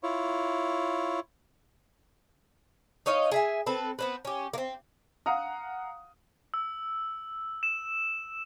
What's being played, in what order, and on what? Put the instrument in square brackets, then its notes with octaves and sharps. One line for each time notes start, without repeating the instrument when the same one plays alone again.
[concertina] E4 F4 C#5
[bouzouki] D#4 C#5 D#5 F5
G#4 E5 G#5
C4 A4 B4
B3 C4 B4
C#4 G4
A#3 C4
[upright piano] F5 F#5 A#5 D#6
[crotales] E6
E7